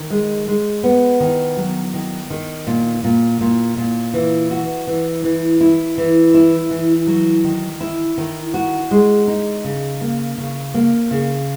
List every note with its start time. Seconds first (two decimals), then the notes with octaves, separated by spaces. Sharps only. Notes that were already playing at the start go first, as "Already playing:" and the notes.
Already playing: D#3
0.10 G#3
0.47 G#3
0.84 B3
1.20 D#3
1.57 F#3
1.94 D#3
2.30 D#3
2.67 A#2
3.04 A#2
3.41 A#2
3.77 A#2
4.14 E3
4.51 F#4
4.87 E3
5.24 E3
5.61 E4
5.98 E3
6.34 E4
6.71 E3
7.07 F#3
7.44 D#3
7.81 E4
8.18 D#3
8.54 F#4
8.91 G#3
9.27 D#4
9.64 C#3
10.01 A#3
10.38 C#3
10.74 A#3
11.11 C#3